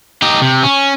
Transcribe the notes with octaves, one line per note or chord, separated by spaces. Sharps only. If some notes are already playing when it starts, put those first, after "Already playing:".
D#4 G4
C3
C#4